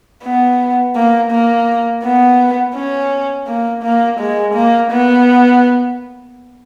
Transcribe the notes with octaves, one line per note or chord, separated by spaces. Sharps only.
B3
A#3
A#3
B3
C#4
A#3
A#3
G#3
A#3
B3